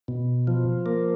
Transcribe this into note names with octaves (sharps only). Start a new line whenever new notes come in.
B2
F3
A#3